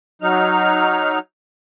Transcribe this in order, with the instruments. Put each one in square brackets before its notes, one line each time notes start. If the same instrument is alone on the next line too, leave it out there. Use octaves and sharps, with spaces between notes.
[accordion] F#3 D#4 F6